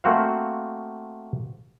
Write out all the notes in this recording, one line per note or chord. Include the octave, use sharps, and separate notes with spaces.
A3 A#3 C4 F#4 C5 F5